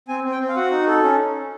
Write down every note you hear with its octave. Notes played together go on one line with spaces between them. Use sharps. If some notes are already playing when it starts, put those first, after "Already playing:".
C4 G#5
C4
G5
C4
F5
F#4 F#5
D#4
A4
C#4